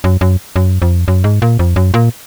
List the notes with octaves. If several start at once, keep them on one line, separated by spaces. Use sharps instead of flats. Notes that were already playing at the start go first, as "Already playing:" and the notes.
F#2
F#2
F#2
F2
F#2
G#2
A#2
F2
F#2
A#2